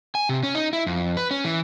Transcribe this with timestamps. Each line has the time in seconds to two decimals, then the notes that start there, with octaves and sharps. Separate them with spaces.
0.15 G#5
0.29 C3
0.43 C#4
0.55 D#4
0.73 E4
0.87 F2
1.17 B4
1.31 C#4
1.44 E3